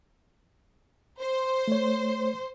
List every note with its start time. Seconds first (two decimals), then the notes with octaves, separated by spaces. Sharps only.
1.19 C5
1.67 A3 C#5